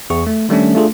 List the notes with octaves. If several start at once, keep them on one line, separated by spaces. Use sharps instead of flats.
E2 G#4 C#6
A3
D#3 G3 A3 C#4 D4
A3 D4 F4 G#4 A4